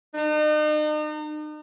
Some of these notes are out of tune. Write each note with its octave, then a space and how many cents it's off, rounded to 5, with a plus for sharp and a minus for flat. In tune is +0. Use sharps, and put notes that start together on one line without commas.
D#4 -40